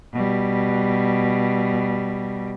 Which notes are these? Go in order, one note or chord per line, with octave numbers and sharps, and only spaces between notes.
B2 G3